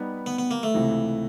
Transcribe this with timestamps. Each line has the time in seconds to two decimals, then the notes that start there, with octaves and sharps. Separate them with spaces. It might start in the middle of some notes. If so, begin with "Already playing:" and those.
Already playing: G3 B3 D#4 G4 B4
0.26 B3
0.39 B3
0.51 A#3
0.63 A3
0.74 C#2 C3 E3